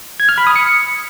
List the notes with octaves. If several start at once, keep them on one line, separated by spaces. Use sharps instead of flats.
G#6
F6
B5
D#6
C#7